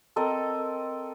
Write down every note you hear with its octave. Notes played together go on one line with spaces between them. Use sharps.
C4 A4 A#4 D#5